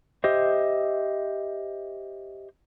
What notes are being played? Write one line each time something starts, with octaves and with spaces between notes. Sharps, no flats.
G4 C5 D#5 E5